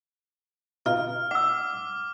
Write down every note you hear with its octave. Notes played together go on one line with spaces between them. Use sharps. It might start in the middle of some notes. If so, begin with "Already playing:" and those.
B2 D#4 F4 F6
F#5 D6 E6